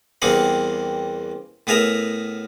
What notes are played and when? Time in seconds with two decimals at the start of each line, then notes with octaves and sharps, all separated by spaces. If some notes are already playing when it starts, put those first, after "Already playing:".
0.22 E2 G3 A#3 C4 G#4 F#5
1.67 A2 B3 G#4 A#4 E5 A#5